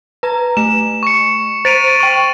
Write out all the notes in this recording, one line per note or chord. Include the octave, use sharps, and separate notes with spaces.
B4 A#5
A3 E7
C#6 C#7
C5 A6 D7 D#7 F7
G5 C#6